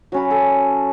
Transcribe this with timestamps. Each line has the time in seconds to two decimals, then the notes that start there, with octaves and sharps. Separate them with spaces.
0.12 F#3 C#4 B5
0.31 A4